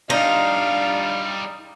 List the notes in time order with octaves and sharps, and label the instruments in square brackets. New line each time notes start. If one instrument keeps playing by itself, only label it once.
[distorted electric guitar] G3 F4 [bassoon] D4 [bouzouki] D#4 [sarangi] F5